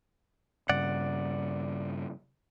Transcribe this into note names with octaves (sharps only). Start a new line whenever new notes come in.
G2 C#3 D5 F#5